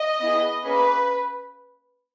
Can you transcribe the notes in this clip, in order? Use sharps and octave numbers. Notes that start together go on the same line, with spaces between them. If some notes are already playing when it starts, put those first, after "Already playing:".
Already playing: D#5
B3 E4 G#4
A#3 C#4 G#4 B4